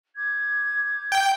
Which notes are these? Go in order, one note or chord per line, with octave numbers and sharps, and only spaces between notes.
D6 G6 G#6
G5